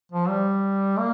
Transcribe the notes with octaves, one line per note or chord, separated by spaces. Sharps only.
F3
G3
A#3